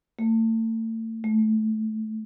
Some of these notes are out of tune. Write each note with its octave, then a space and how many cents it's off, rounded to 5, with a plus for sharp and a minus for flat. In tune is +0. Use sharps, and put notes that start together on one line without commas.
A3 +35
A3 -15